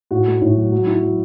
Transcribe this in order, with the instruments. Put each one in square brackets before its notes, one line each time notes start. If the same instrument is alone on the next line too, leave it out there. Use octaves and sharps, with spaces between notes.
[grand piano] A2 F#4
A3
A2
F#3
F#3
E4
F#3